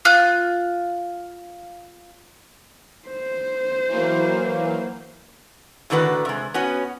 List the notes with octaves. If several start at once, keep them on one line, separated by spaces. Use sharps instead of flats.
F4 F#6
C5
E3 F#3 A#3
A2 D3 D#3 F#4 B4
C3 G#3
B3 C#4 F#4